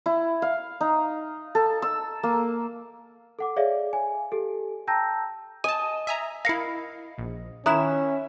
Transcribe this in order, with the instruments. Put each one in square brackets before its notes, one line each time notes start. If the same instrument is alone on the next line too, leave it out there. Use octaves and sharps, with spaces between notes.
[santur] E4
F5
D#4
A4
E6
A#3
[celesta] A4 F#5 D6
G#4 C#5 D5 E5 F5
G#5
G4 A4
G5 A5 A#5 E6 G6 A#6
[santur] D#5 [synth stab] G#5 A5 [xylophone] D#7
[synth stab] E5 G#5 A#5
[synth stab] E4 A#4 F5 [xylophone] A#6 C#7
[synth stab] A#1
[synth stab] D#3 E4 E7 [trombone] C#4 [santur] E5 [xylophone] A#5 D#6 F#6